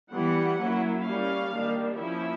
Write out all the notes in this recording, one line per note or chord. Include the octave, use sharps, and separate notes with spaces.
E3 G3 B3 F#5
F#3 A#3 C#4 E4
G3 A#3 C#4 F5
D#3 G3 A#3 D4
F3 A#3 C#4 E4 E5